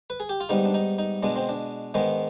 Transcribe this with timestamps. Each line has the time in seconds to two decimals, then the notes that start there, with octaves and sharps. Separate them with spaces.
0.10 B4
0.20 G#4
0.29 G4
0.41 F4
0.49 G#2 G3 B3 D#4
0.65 D4
0.74 D#4
0.99 D#4
1.23 B2 G#3 B3 D4
1.36 C4
1.49 D4
1.94 G#2 D#3 G#3 B3